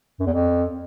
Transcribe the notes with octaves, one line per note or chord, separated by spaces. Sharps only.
F#2
E2
F2